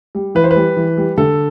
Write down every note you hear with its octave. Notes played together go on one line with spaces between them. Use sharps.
G3
E3 B4
C5
B4
G3
E3
G3
D3 A4